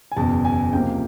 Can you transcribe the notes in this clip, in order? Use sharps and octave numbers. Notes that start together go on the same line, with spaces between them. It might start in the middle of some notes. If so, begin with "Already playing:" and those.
G#5
F#1 E2 B2 A5
G#5
C#2 C3 F3 A#3 G5